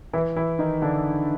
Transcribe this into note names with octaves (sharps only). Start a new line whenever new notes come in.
E3 E4
E3 E4
D#3 D#4
D3 D4